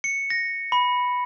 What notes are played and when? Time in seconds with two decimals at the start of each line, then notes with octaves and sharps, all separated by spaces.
0.04 C#7
0.30 A#6
0.72 B5